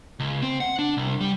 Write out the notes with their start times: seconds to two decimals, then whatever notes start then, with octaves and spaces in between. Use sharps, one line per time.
0.20 C#2
0.42 C4
0.60 F#5
0.79 D4
0.97 C2
1.21 G3